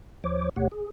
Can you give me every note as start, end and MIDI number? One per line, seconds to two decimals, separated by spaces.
0.24 0.49 39
0.24 0.49 53
0.24 0.49 72
0.24 0.49 73
0.24 0.49 86
0.56 0.68 38
0.56 0.68 47
0.56 0.68 57
0.56 0.68 67
0.56 0.68 73
0.56 0.68 78
0.72 0.90 68